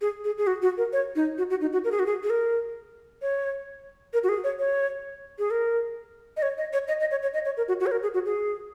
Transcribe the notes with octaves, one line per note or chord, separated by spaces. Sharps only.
G#4
G#4
G#4
F#4
F#4
A#4
C#5
D#4
F#4
F#4
D#4
F#4
A#4
G#4
F#4
G#4
G#4
A#4
C#5
A#4
F#4
G#4
C#5
C#5
G#4
A#4
D#5
C#5
D#5
C#5
D#5
D#5
C#5
C#5
D#5
C#5
A#4
F#4
F#4
C#5
A#4
G#4
F#4
G#4